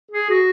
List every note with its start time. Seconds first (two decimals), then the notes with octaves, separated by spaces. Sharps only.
0.10 G#4
0.30 F#4